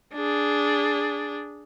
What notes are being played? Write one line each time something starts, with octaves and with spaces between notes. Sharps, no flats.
D4 G#4